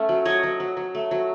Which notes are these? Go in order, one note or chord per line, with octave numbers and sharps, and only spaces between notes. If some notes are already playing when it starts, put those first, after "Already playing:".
Already playing: A3 C#4
F#3
F#3 C#5 D#5
F#3
F#3
F#3
A3
F#3